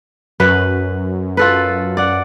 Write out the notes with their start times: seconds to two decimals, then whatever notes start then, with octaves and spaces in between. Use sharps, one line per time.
0.40 F#2 B4
1.37 F4 A4 B4
1.97 D5 F#5